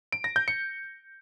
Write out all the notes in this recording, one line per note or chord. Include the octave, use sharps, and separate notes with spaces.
D7
A#6
G6
C#7